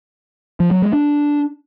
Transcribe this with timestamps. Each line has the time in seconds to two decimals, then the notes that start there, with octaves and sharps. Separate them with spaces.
0.60 F3
0.71 F#3
0.82 G#3
0.93 D4